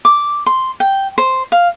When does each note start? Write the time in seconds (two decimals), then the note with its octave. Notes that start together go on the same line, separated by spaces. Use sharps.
0.05 D6
0.46 C6
0.80 G5
1.18 C5
1.52 F5